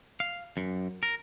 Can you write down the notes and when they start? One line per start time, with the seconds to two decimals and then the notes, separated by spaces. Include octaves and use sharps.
0.20 F5
0.57 F#2
1.03 A#4